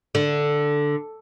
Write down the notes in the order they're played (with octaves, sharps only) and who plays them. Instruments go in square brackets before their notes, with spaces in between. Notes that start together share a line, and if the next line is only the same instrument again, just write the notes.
[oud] D3